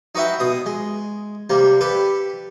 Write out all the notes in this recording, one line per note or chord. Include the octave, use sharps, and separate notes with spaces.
D#4 F#4 B4 E5 G5
B2 D#6
G#3
C3 G3 A#3
G4 A4 B4